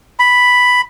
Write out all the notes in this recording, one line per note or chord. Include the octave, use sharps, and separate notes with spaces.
B5